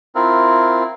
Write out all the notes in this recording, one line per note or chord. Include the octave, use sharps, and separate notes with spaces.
C4 E4 F4 A#4